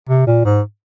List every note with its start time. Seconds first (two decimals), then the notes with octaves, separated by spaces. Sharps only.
0.09 C3
0.27 A#2
0.45 G#2